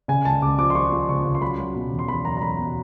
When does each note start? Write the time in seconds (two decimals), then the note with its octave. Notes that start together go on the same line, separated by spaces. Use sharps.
0.08 C#3 G#5
0.25 C#2 A5
0.42 C#2 D6
0.58 F3 D6
0.70 C6
0.75 F3 C#6
0.92 F3
1.09 C#2 C#6
1.25 C#3
1.35 C6
1.42 F#3 B5
1.59 F#3
1.75 B2
1.92 E2
1.99 C6
2.08 E2 B5
2.25 F#3 A#5
2.37 A#5
2.41 F#3 B5
2.58 B2